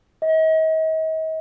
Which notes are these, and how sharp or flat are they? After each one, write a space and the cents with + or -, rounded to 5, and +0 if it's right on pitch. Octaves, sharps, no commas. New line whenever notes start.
D#5 +40